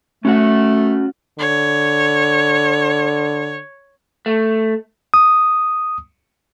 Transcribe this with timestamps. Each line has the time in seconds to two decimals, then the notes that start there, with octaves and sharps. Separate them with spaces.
0.25 A3 C#4 F#4 F#5
1.39 D3 C#5
4.26 A3
5.14 D#6